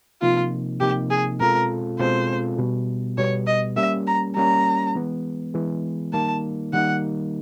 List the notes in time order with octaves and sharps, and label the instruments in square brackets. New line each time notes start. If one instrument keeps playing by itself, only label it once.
[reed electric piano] C3 F3 A#3 D#4 [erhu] F4
[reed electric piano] C3 F3 A#3 D#4 [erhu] G4
[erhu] G#4
[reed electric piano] B2 G#3 C4 F4 A4 [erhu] A#4
[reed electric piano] B2 G#3 C4 F4 A4 [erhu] C5
[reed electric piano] B2 G3 B3
[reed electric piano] B2 G3 B3 [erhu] C#5
[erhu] D#5
[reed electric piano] G3 A#3 C#4 [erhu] E5
[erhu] A#5
[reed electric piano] G3 A#3 C#4 [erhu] A#5
[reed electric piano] E3 G#3 B3
E3 G#3 B3
[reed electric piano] D#3 G3 A#3 D#4 [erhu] A5
[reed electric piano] D#3 G3 A#3 D#4 [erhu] F#5